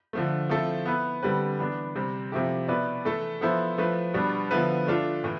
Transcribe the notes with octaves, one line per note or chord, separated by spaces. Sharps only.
D3 F3 A3
F3 A3 C4 E4 A4
B3 E4 B4
D3 G3 C4 G4 B4
E3 B3 D4
C3 G3 C4
C3 F3 A3 E4 G4
B2 B3 E4 B4 D5
E3 A3 E4 A4
F3 B3 E4 A4 C5
F3 A3 E4 B4
B2 G3 B3 D4
D3 F3 B3 E4 B4
A3 D4 F4 A4
A2 E3